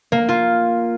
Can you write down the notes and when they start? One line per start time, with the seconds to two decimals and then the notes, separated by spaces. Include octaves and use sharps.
0.12 A#3
0.29 F4